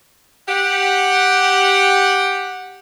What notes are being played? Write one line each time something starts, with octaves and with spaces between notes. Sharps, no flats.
G4 F#5